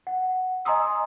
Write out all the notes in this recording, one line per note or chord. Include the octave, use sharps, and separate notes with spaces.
F#5
D#5 G#5 A#5 C6 D#6 E6